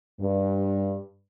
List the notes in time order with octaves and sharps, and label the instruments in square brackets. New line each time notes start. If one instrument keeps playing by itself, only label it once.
[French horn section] G2